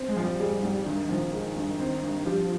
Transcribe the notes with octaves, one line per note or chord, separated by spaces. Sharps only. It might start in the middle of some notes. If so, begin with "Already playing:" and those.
Already playing: C4
G#3
F3
G3
G3 G#3
G#2
G2 D#3
F3
G#3
G2
C4
G2
F3 G3